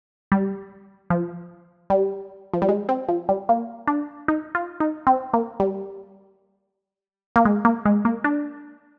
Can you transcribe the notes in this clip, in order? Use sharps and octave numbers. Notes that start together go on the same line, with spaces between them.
G3
F3
G3
F3
G3
G#3
C4
F3
G3
A#3
D4
D#4
F4
D#4
C4
A#3
G3
A#3
G#3
A#3
G#3
A#3
D4